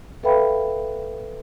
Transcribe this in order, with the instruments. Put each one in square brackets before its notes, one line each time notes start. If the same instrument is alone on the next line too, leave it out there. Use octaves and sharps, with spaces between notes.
[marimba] A4 B4 E5 F5 G5 B5